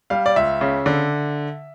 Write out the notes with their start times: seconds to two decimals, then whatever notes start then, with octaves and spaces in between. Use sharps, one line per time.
0.10 G3 F5
0.26 D5
0.36 C#2 E5
0.61 C#3
0.86 D3